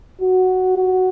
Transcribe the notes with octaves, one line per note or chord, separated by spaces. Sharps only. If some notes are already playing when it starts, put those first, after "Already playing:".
F#4
F#4